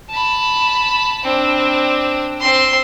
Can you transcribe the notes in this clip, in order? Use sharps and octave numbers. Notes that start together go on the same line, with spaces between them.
A5 B5
C4 D4
C4 C6